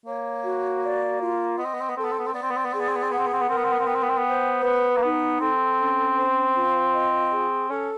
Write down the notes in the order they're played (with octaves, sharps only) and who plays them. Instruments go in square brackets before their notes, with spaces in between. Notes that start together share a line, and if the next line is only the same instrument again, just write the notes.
[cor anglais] A#3 [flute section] C#5
[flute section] F#4
D5
F4
[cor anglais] B3 [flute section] D#5
[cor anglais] C4
B3
C4
B3
[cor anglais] C4 [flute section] A4
[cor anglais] B3
C4
B3
C4
[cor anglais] B3 [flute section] D5
[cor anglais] C4
B3
C4
B3
[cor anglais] C4 [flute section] G#4
[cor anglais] B3
C4
B3
C4
[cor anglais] B3 [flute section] F#5
[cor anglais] C4
B3
C4
B3
[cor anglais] C4 [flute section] A#4
[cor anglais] B3
C4
B3
C4
[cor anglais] B3 [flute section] G5
[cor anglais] C4
B3
C4
B3
[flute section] C5
[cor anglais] B3 [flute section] B4
[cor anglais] A#3
[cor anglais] B3 [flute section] D#4
[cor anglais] C4 [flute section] A4
[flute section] C#4
C5
F4
D#5
G#4
[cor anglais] C#4 [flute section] A4